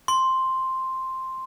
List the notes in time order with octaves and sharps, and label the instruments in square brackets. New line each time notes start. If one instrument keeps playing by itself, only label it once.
[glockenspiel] C6